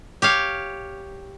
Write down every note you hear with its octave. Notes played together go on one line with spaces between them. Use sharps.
G4 C#5 F5